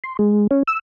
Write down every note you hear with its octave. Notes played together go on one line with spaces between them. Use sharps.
C6
G#3
C#4
E6